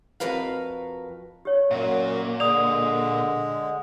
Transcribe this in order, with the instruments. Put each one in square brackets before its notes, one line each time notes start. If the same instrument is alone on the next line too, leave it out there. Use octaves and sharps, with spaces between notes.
[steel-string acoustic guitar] F2 F#4 A#4 B4 F5
[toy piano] G4 C#5
[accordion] F#2 F#4 [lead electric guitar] A#2 [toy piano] E5
[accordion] D3 G#3 [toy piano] D5 [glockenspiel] D#6 F7